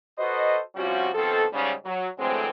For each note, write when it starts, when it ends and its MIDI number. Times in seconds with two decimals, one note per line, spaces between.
0.18 0.60 66
0.18 0.60 69
0.18 0.60 71
0.18 0.60 72
0.18 0.60 75
0.76 1.09 48
0.76 1.09 53
0.76 1.09 55
0.76 1.09 61
0.76 1.09 65
0.76 1.09 66
1.14 1.44 47
1.14 1.44 51
1.14 1.44 53
1.14 1.44 60
1.14 1.44 69
1.53 1.73 44
1.53 1.73 49
1.53 1.73 55
1.53 1.73 61
1.85 2.09 54
2.18 2.49 50
2.18 2.49 52
2.18 2.49 54
2.18 2.49 56
2.18 2.49 57
2.18 2.49 60